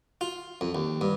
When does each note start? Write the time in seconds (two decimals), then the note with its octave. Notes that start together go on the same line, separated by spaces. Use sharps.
0.21 F4
0.61 F2
0.75 D#2
1.01 G2